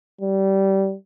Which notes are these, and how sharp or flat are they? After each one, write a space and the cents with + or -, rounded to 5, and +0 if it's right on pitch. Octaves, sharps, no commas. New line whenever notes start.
G3 -20